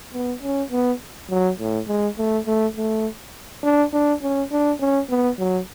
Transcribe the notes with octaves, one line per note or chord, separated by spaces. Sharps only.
B3
C#4
B3
F#3
A2
G#3
A3
A3
A3
D4
D4
C#4
D4
C#4
B3
F#3